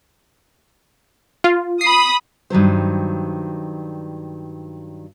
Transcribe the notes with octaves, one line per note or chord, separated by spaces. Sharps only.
F4
B5 D#6 C7
G2 D#3 F#3 C5